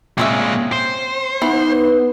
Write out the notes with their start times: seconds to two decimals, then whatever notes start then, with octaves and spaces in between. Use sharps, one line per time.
0.18 A#2 G#3 C4 C#4 E5
0.72 C5
1.42 E3 B3 D#4